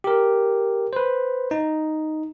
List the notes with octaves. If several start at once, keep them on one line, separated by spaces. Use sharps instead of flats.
G4 A#4
B4 C5
D#4